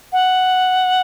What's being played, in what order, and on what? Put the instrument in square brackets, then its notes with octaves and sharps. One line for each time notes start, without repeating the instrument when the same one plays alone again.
[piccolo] F#5